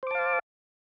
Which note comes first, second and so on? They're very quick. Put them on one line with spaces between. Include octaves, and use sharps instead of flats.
C5 D6 A5 F5